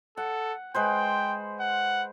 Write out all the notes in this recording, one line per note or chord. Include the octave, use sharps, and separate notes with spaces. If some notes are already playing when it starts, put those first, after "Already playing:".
A4 F#5
G#3 B4 C5 G5
F#5